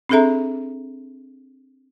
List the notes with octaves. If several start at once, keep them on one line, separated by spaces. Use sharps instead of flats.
C4 D4 G#4 A4 E5 A#5